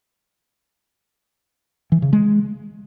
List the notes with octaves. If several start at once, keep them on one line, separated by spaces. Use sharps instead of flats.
E3
C#3
G#3